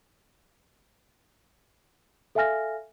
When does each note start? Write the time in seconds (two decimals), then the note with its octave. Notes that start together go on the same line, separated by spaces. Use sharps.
2.35 A4 E5 F5 G#5 F6 A#6